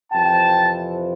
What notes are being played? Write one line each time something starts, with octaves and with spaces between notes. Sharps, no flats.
F2 C3 E3 G5 A5